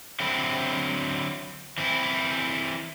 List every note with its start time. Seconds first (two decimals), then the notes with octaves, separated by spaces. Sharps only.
0.20 D3 F#3 C4 E4
1.78 E3 C4 E4